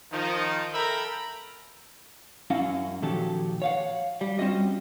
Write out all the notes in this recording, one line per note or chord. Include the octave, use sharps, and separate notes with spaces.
D#3 F3 D#4
A4 A#4 E5 G5 A#5 B5
F#2 C#4 E4 D#5 F5 F#5
A#2 D#3 F3 F#4 G4 A4
C#5 F5 F#5
G3
G3 C4 C#4 F4 F#4 D#5